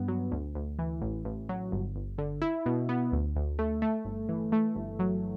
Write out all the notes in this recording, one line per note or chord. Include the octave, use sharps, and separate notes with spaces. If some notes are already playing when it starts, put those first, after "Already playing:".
Already playing: G2 B3
F#3
D2
D2
E3
A1
A1
F#3
G1
G1
D3
E4
B2
B3
D2
D2
A3
A3
G1
E3
A3
G1
F#3